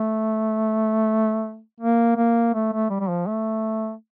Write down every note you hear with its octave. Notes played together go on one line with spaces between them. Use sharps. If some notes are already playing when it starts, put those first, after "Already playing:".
Already playing: A3
A#3
A#3
A3
A3
G3
G3
F3
A3